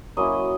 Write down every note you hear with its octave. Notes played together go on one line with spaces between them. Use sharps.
F#3 A#3 C#4 E4 D#5